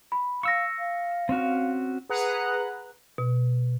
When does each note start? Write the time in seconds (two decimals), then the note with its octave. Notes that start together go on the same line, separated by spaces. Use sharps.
0.12 B5
0.43 F5 C#6 E6 A#6 C#7
0.78 F5
1.29 C4 C#4 F#4
2.09 G#4 B4 F#5 A#5 F#6
3.18 B2